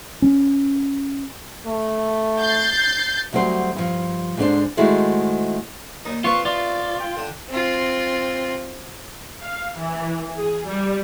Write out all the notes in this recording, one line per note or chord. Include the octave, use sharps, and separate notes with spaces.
C#4
A3
G6 A6 C7
D2 F#3 G3 C4 C5
G2 F3
G#2 D3 D4 C5
D#3 G#3 A3 E4 F#4 C5
D#2 G3 D#4
G3 C4 F4 B4 C#6
F4 D5
G5
D3 D4
C4 F4
F5
E3
G#4
G3